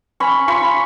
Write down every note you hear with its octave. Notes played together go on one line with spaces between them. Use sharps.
C#4 B5 C#6
F4 B5 C#6